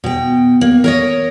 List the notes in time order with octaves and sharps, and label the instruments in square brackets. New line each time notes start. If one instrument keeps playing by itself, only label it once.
[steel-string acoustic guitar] B2 G5
A#3
A#4 C#5 D#5